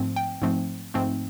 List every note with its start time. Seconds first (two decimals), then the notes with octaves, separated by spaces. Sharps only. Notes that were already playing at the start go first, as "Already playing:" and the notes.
Already playing: G#2 F3 A3 C4
0.16 G5
0.42 G#2 F3 A3 C4
0.94 G#2 F3 A3 C4